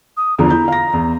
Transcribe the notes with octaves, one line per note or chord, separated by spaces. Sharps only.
D#6
E2 D3 F3 A#5
E4 G6
F5 A#6
E2